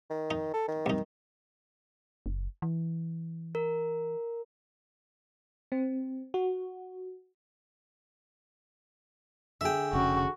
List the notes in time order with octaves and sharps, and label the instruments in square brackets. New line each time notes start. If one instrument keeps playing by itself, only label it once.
[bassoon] D#3
[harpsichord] D#4
[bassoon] A4
D#3
[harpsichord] C2 D#4
[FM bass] F#1
E3
[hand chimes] A#4
[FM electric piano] C4
F#4
[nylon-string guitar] D3 G#4 [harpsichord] E5 G5
[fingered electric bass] F1 C#3 C#4 [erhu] F#4